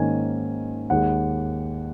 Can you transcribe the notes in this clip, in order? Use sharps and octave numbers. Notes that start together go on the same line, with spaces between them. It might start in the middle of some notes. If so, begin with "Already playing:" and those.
Already playing: G#2 D#3 A#3 C#4 G#5
D#2 D#3 G#3 F#5